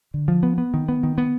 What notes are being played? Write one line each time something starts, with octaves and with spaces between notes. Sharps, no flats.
D3
F3
B3
B3
D#3
B3
D#3
B3